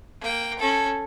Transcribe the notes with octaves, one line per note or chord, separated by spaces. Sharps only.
A#3 G5
C#4 A4